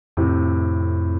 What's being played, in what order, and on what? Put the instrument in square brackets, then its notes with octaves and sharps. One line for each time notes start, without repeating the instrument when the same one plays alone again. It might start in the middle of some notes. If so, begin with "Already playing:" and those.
[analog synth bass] F2 [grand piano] A2 C3